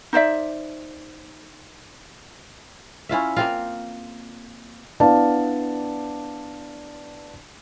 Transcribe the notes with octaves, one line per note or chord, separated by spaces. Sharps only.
D#4 C5 D5 E5
C#4 E4 F4 E5
A#3 C4 F4
B3 D4 E4 D5 F5 A5